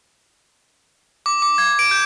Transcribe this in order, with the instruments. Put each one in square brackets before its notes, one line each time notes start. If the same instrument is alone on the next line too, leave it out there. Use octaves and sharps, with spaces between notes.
[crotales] D6
D6
G#6
D7
G6